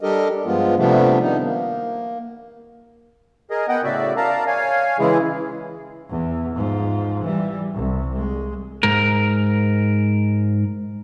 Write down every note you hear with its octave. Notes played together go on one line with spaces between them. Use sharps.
G3 D4 G4 A4 A#4 D#5
G2 F3 G#3 B3 F4
C3 F3 G3 A3 B3 D4
D#3 B3 D#4
A#3
G#4 A#4 D#5
B3 D#5 F#5 G5
A2 C#3 F#4 D5 E5
A#4 D5 F5 A5 A#5
C#5 F5 G#5
C#3 E3 G#3 E4 G#4
E2
G#2 F3
E3 G3
C2
G#3
G#2 A#4